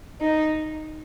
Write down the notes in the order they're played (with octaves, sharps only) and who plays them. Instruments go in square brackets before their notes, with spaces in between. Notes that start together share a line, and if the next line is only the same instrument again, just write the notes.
[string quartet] D#4